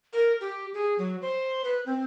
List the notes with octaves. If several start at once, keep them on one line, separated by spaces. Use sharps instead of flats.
A#4
G4
G#4
F#3
C5
B4
C4